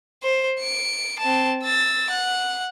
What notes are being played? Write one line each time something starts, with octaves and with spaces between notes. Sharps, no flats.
C5
C#7 D7
C4 A5
E6 A6
F#5